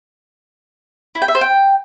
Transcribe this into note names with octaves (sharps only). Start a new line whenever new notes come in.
E4
G5
E5
C5
G5